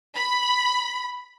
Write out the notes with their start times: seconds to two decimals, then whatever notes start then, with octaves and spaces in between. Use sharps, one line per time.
0.15 B5